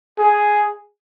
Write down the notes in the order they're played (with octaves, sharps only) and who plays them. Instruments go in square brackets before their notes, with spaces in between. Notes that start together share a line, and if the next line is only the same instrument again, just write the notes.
[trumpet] G#4